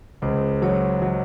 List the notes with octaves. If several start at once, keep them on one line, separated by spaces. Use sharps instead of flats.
C#2 C5
F#3 C#5
F#3